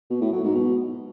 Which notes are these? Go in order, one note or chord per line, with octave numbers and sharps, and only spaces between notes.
B2
A2
F#3
G#2
B2